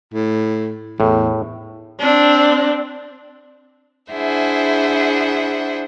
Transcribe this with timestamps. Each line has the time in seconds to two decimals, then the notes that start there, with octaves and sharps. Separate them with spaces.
0.14 A2
1.00 E2 A2
2.00 C4 D4
4.11 D4 E4 G#4 C5 E5 F#5